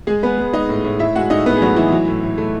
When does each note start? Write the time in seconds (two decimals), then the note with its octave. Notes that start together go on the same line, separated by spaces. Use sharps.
0.07 G#3 G#4
0.23 G#3 B3 B4
0.38 G#3
0.53 G#3 D#4 D#5
0.69 A2
0.84 A2
0.99 A2 E4 E5
1.15 G#3 F#4 F#5
1.30 A2 D#4 D#5
1.46 A2 B3 B4
1.56 G#4
1.61 A2 F#3 F#4
1.76 A2 E3 E4
1.92 F#3
2.08 A2
2.23 A2
2.38 A3